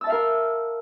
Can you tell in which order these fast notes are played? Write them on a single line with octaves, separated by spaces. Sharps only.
E6 A5 E5 F5 A#4